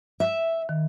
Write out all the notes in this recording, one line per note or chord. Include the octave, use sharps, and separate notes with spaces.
E5
D#3